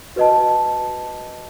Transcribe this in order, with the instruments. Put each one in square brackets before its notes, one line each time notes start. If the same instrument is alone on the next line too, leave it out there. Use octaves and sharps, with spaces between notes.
[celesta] F#4 B4 D#5 A5